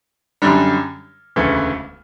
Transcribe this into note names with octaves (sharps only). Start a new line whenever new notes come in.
F#2 D3 G3
E1 D2 C#3 E3 A3